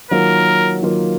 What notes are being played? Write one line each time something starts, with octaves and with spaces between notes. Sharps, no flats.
D#3 F#3 A#3 F4 A#4
D#3 F#3 A#3 F4